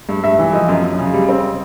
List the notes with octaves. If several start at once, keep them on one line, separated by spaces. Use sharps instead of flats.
G2
G2 E5
E3
F3 D#5
F#2
F#2
C#3
G3
C4